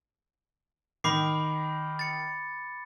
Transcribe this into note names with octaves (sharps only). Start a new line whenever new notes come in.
D#3 D#4 B5 D6 C7
A6 C#7